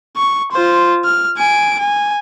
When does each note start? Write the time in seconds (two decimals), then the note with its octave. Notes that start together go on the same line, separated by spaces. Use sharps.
0.16 C#6
0.52 F4 C5
1.05 F6
1.37 G#5 D7
1.79 G#5